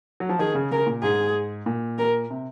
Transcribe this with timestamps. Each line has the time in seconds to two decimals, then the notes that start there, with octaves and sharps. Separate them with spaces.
0.20 F#3
0.29 F3
0.39 D#3 G#4
0.55 C#3
0.71 C#3 A#4
0.87 A#2
1.02 G#2 G#4
1.66 A#2
1.98 A#4
2.30 C3